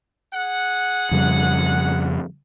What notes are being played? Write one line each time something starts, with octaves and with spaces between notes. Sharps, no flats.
G#4 F#5
F2 C#3 G3